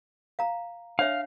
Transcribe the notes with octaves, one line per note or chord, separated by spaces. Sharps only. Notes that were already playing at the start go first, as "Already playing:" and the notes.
F5 A#5
D4 C#5 E5 F5